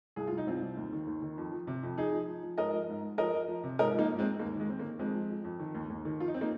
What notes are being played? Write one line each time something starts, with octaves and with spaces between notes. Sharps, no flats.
C2 G#4
C2 F4
D#4
C2 C4 F4
C2
D#2
D#3
D#2
D#3
F2
F3
C3
F2
F3 D#4 G#4
F3
F3
F3
G#2 A#4 D#5
F3
G#2
G#2
F3 A#4 D#5
F3
F3
C3
G#2 A#4 D#5
F3
A#3 D#4
G#2
G#3 C4
G#2
D#2 A#3
D#3
G#3
D#3 C4
A#3
D#3
F2 G#3 C4
F3
F3
F2
D#3
D#2
D#2
D#3
F3 F4
D#4
C4
A#3 D#4